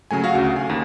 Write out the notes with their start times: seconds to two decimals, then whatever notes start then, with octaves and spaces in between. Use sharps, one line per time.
0.11 C#3 F#3 A3 G#5
0.24 F#4 F5
0.35 D2 C#3
0.56 G#5
0.70 D#2